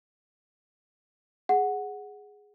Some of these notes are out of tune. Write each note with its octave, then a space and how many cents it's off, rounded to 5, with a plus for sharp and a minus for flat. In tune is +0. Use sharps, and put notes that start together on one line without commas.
G#4 +0 F#5 +0